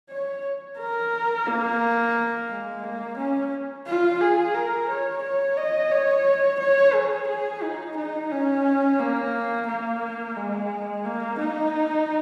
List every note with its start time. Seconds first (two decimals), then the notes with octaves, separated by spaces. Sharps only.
0.10 C#5
0.78 A#4
1.47 A#3
2.49 G#3
2.84 A#3
3.17 C#4
3.87 F4
4.21 G#4
4.54 A#4
4.89 C#5
5.22 C#5
5.57 D#5
5.91 C#5
6.60 C#5
6.94 G#4
7.28 G#4
7.62 D#4
7.97 D#4
8.31 C#4
9.00 A#3
9.67 A#3
10.36 G#3
11.05 A#3
11.38 D#4